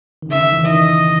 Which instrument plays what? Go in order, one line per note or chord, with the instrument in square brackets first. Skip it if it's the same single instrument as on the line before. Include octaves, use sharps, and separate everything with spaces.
[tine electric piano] D#3
[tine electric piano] C#3 [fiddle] E5
[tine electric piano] D#3
E3
[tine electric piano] D#3 [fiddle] D#5